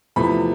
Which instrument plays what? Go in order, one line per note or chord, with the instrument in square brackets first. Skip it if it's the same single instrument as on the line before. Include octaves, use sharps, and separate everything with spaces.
[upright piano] E2 C3 F3 A3 B5